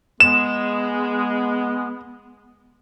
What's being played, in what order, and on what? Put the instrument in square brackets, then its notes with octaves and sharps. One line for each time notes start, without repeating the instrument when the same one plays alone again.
[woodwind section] G#3 [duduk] B3 [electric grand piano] E7